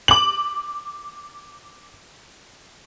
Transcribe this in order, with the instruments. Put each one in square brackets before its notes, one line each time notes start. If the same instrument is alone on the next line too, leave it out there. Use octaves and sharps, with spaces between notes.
[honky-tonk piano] D6 F#7